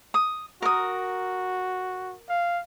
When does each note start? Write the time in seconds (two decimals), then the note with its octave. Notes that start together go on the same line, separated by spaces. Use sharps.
0.14 D#6
0.62 F#4 A#4 D#6
2.29 F5